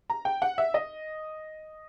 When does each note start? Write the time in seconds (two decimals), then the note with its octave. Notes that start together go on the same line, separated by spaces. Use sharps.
0.10 A#5
0.25 G5
0.42 F#5
0.58 E5
0.74 D#5